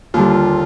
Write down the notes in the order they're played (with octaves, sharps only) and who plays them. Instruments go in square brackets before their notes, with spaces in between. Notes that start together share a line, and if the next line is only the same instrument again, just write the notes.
[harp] D#2 D3 G3 [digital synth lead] F4